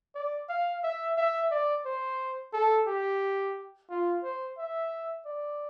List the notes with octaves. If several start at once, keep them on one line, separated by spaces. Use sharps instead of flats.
D5
F5
E5
E5
D5
C5
A4
G4
F4
C5
E5
D5